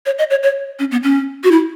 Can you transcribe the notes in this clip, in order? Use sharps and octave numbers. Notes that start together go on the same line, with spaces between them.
C#5
D#5
C#5
C#5
C#4
B3
C#4
F#4
E4